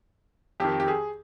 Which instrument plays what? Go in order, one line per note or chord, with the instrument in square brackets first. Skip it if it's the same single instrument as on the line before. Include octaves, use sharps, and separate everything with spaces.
[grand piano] F2 D#3 G4
G4
G#4